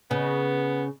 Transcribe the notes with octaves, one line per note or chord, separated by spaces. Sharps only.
C#3 B3